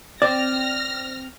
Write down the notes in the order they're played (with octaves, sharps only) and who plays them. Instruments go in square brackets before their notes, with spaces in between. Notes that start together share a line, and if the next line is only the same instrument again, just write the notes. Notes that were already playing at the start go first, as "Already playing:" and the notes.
[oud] C4 C5 [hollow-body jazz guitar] D5 [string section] F6 A#6